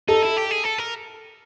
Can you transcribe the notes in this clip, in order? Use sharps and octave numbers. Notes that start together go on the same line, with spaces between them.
D#4 A4
E4
G4
G#4
A4
A#4